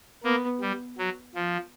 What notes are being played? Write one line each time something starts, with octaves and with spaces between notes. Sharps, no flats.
A#3 B3
G3
F#3
F3